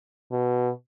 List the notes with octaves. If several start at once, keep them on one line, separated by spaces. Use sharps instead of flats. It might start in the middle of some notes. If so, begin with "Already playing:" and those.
B2